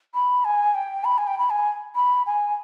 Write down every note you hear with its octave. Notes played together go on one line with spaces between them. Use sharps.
B5
G#5
G5
B5
G#5
G5
B5
G#5
B5
G#5